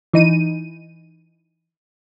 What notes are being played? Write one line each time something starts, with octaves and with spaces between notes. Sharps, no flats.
E3 D#4 D#7